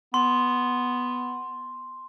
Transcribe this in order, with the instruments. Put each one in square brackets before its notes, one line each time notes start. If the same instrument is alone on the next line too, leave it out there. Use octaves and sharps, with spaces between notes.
[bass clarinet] B3 [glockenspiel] C6